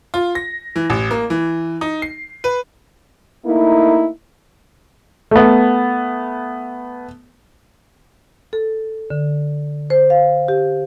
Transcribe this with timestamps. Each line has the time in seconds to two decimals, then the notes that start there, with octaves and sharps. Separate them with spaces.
0.14 F4
0.35 A#6
0.76 E3
0.90 A1
1.11 A#3
1.30 E3
1.81 D#4
2.02 C7
2.44 B4
3.45 A3 A#3 D#4 E4
5.31 A3 B3
8.53 A4
9.10 D3
9.90 C5
10.10 F5
10.48 G4